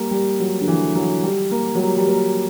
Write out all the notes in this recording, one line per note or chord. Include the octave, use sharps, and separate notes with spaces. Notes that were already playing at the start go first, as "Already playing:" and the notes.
Already playing: G3 A#3
G3
F#3
D3
E3
F#3
G3
A#3
F#3
G3
G3
A#3